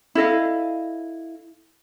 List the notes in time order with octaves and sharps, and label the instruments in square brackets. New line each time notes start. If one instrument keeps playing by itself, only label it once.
[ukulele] E4 A4 D#5 F5